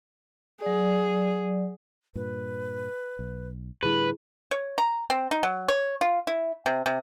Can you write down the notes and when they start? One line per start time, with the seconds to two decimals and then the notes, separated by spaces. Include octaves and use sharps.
0.62 F#3 G#4 D5
2.15 G2 A#2 B4
3.19 B1
3.83 A2 D3 G3 E4 G#4 B4
4.51 C#5
4.78 A#5
5.10 C4
5.31 D#4
5.43 F#3
5.68 C#5
6.01 F4
6.27 E4
6.66 C3
6.86 C3